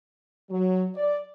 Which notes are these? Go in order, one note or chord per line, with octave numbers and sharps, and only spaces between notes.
F#3
D5